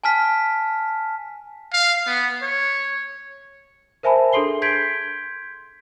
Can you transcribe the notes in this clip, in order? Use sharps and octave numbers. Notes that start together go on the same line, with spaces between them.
G#5 A5 F6 B6
F5
B3
C#5
A#4 C5 E5 G#5 A5 B5
D4 G#4 A4 C6 C7 G7
C6 G6 G#6 B6 D7